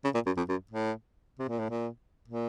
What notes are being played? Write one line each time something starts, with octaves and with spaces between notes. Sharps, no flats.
C#3
A#2
F#2
F2
F#2
A2
C3
A#2
A2
A#2
A#2